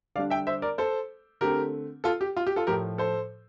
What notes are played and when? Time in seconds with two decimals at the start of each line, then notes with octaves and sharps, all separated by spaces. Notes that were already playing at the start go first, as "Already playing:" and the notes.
0.15 D3 G3 D4 D5 F5
0.30 E5 G5
0.47 C5 E5
0.62 A#4 D5
0.78 A4 C5
1.41 D3 A3 C4 G4 A#4
2.04 F4 A4
2.21 G4
2.37 F4
2.47 G4
2.56 F4 A4
2.67 A2 F3 A3 G4 A#4
2.98 A4 C5